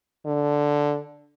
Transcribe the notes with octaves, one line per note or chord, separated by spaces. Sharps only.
D3